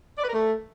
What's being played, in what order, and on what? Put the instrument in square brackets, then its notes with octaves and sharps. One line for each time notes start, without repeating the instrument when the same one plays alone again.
[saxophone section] D5
B4
A#4
A3